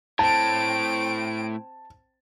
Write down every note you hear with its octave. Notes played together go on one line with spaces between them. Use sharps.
A2 C4 A5 D7